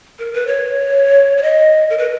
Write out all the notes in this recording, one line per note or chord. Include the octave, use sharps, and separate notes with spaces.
A#4
B4
C#5
C#5
D#5
A#4
B4